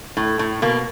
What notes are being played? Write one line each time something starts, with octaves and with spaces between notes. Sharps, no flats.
A2
A2
B2 A#3